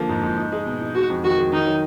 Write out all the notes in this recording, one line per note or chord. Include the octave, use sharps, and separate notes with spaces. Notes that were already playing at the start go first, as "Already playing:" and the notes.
Already playing: D3 F3 A#3
G#2
G#2
D#4
G#3
B2
D#4
G#3 F#4
F2
D#3 F#4
G#3
D#3 D#4
F#3